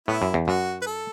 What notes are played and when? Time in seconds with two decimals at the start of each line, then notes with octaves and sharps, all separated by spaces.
0.08 A2 B3 E4
0.22 F#2
0.34 E2
0.48 F#2 F#4
0.82 B4
0.86 A4